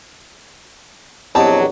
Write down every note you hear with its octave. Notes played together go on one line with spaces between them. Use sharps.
A#1 E2 F#3 C4 G4 D#5 A5